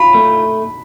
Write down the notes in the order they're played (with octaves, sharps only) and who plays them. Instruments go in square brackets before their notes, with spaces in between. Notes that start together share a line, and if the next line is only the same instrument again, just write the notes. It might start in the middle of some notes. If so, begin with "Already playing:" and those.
Already playing: [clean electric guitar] F4 [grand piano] B5
[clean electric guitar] A3